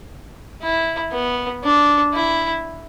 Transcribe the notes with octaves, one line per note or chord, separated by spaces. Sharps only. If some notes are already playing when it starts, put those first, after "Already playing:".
E4
B3
D4
E4